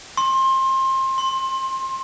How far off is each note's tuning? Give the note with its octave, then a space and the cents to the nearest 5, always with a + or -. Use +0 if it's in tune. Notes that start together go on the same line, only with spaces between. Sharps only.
C6 +25
C6 +10